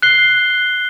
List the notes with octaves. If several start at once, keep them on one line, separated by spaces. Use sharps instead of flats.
F#6 C7 G7